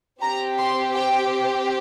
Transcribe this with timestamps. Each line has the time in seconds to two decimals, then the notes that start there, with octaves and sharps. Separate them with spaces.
0.22 C4 G4 A#5
0.58 C6
0.94 G5